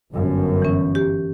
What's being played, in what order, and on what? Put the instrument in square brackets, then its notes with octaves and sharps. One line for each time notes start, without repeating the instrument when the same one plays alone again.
[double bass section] G1 F#2
[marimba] E3 C#4
G4